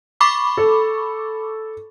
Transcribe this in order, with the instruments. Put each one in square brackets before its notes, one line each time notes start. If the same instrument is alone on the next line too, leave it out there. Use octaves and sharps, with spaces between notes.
[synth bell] B5 C#6 D6
[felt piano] A4